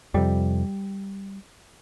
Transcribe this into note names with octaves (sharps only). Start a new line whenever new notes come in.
F2 C3 G3